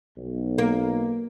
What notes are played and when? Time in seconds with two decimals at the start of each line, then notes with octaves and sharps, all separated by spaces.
0.16 B1
0.58 A#3